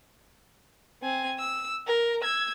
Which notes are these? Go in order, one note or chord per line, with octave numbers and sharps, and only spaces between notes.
C4 G#5
E6
A#4
E6 G#6